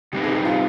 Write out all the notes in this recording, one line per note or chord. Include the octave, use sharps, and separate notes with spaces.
C3 G3 C4 D#4 G4 B4
G#4
G4
F4